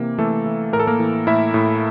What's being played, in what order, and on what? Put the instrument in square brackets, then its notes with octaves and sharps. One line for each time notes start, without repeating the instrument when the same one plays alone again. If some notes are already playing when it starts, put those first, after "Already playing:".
Already playing: [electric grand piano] C3 E3 A#3
E3 A3 A4
E3
A2 A#4
A4
A#3 A#4
E3
A2 E4 E5
A2